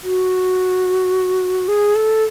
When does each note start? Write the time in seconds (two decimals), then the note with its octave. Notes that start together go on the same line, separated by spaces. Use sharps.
0.03 F#4
1.68 G#4
1.95 A4